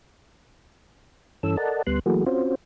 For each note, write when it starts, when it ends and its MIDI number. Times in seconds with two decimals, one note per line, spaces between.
1.43 1.57 43
1.43 1.57 52
1.43 1.57 61
1.43 1.57 69
1.43 1.57 88
1.57 1.82 69
1.57 1.82 70
1.57 1.82 74
1.57 1.82 75
1.57 1.82 78
1.57 1.82 81
1.87 1.99 38
1.87 1.99 55
1.87 1.99 59
1.87 1.99 84
1.87 1.99 90
2.06 2.25 52
2.06 2.25 54
2.06 2.25 57
2.06 2.25 58
2.06 2.25 66
2.06 2.25 68
2.26 2.55 60
2.26 2.55 61
2.26 2.55 65
2.26 2.55 66
2.26 2.55 72